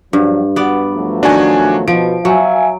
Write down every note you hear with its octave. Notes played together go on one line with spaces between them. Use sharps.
G2 F3 F#3
B3 F#4 D5
F3 F#3 A3
D#3 D4 F#4 D#5 G#5
B2 F3 D7
F#3 E5 F5 G#5